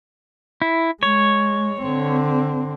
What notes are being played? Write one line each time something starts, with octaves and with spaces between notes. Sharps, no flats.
E4
G#3 C#5
D3 C4